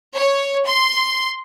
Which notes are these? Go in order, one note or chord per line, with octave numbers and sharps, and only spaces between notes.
C#5
C6